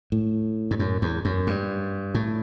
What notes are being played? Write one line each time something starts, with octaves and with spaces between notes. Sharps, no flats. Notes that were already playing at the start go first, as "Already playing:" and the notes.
A2
G2
F#2
E2
F#2
G2
A2